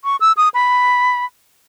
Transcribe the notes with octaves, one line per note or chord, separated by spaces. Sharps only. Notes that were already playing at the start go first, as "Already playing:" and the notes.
C#6
E6
D#6
B5